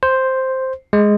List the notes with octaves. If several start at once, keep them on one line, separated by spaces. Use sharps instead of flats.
C5
G#3